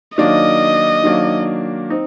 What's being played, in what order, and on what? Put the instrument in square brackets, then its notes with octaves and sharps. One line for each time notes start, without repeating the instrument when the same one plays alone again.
[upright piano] D#3 F#3 A#3 D4 [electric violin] D#5
[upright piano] D#3 F#3 A#3 D4
C4 D#4